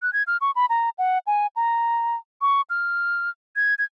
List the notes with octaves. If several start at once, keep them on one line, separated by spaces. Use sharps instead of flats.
F#6
G#6
F6
C#6
B5
A#5
F#5
G#5
A#5
C#6
F6
G#6
G#6